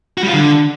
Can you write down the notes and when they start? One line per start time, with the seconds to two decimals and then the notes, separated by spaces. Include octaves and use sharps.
0.18 F#4
0.23 G3
0.28 F4
0.33 D3